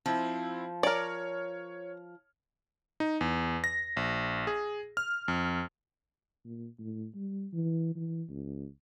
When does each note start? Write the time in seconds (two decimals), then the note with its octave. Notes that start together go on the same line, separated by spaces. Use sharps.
0.06 F3 C4 E4
0.83 A#4 C#5 D5 F6
3.00 D#4
3.21 E2
3.64 A#6
3.97 A#1
4.47 G#4
4.97 F6
5.28 F2
6.45 A#2
6.79 A2
7.15 G3
7.53 E3
7.96 E3
8.29 C#2